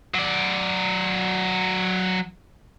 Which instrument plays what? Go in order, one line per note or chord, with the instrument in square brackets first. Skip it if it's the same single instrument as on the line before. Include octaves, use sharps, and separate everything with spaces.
[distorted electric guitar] F#3 D5